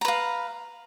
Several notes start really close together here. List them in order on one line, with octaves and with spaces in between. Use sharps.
A#5 B4 F5